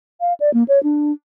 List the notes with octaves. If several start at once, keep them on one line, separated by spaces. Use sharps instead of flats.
F5
D5
A#3
C#5
D4